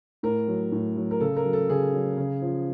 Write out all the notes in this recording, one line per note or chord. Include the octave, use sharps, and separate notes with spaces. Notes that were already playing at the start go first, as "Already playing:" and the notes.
A2 A#4
F#3
A2
F#3
A#4
C#3 A4
A#4
F#3
A4
C#3 G#4
F#3
C#3
F3